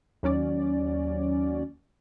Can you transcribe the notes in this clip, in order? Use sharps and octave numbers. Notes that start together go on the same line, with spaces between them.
D#2 F#3 C#4 D5